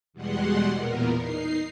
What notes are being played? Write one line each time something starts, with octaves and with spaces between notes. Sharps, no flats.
E2 B2 G3 G#3 F#5 C6
E2 A#2 B3 A#4
D#4 C7